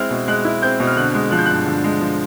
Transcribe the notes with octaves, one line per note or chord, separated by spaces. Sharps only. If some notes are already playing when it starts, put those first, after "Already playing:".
Already playing: G#3 C4 E4 F6
B2
G#3 F#6
E4
C4 G6
B2
F6
D3 F#6
G#3
F3 F#6
G6
G2 F#6
D3
G#3
F3